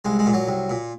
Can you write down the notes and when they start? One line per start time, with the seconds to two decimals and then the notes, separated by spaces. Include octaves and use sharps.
0.05 C2 G#3
0.19 G#3
0.26 A#2
0.33 F#3
0.48 C2
0.70 A#2